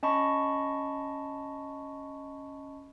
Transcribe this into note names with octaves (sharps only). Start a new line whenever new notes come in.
C#4 D#5 A5 B5 C#6